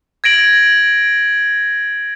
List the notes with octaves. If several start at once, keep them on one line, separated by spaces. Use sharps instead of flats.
G#6 A#6 D7 F#7